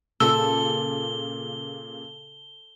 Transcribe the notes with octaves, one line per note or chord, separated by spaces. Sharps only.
A#2 C#3 A4 E6 G7